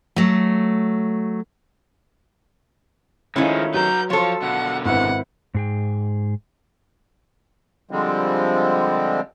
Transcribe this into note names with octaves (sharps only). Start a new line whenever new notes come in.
F#3 A3
D#3 F3 G#3 A3 C#4 E4 F4
F#3 B4 F#5 A#5 G6
F3 F4 A4 C#5
B2 D3 F#5
G#1 E4 B4 F#5
G#2 G#4 G5
D3 F3 G3 G#3 C4